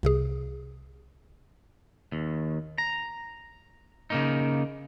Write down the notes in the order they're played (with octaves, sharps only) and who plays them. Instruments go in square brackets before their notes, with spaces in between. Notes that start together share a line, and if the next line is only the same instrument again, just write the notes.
[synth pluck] C2 C3 G#4
[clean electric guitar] D#2
A#5
C#3 A#3 D#4